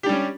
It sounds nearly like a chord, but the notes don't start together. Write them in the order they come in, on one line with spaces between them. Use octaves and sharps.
G4 D4 G3 C#4